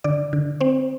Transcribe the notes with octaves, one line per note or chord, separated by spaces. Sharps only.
D3 D5
D3
C4 C5